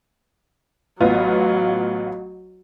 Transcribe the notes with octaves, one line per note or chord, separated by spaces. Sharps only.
A1 F#3 B3 F4